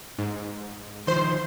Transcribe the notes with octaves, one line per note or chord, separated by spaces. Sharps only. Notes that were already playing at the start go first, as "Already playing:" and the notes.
G#2
D#3 F3 C5 C6